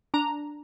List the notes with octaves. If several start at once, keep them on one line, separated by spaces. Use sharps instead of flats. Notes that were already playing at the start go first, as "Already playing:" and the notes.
D4 A#5